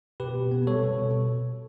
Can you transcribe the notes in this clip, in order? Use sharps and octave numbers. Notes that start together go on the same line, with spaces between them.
B2 G4 B4
B2
B3
G3 A4 C#5
B2
B2